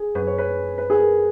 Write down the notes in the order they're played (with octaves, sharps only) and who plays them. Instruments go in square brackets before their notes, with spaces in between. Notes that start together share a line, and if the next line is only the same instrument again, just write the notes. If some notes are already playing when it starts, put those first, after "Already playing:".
Already playing: [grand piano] G#4
[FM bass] F#2 [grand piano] B4
[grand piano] C#5
B4
B4
G#4
A#4